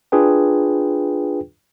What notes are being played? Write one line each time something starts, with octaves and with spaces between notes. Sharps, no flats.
D4 F4 G#4 B4 G5